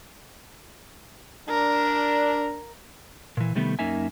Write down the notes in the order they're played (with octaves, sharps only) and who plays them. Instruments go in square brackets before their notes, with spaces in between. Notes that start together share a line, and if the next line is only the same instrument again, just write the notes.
[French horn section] D4 [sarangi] A#4
[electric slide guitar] A#2 E3
C3 D#3 G3 A3 B3
F#2 A#3 C#4 D#4 E5 G#5